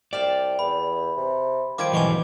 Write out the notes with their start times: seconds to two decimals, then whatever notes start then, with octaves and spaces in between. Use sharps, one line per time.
0.13 C2 G4 D5 F5 A5
0.59 E2 B5
1.17 C3
1.78 D#3 F3 G3 C5 D6 G#6 D7
1.93 B1 B2 E3 G#5 C#6 D6